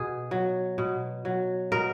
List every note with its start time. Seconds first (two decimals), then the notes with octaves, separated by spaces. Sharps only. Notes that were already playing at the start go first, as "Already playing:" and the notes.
Already playing: B2 G#4
0.31 F#3
0.78 B2
1.25 F#3
1.72 B2 A#4